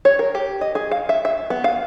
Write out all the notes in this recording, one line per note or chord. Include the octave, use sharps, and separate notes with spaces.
C#5
A#4
G4
D#5
G#4
F5
E5
E5
B3
F5